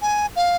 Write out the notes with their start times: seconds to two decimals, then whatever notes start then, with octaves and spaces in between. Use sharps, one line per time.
0.02 G#5
0.36 F5